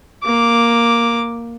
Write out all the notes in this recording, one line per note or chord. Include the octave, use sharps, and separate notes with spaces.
A#3 D6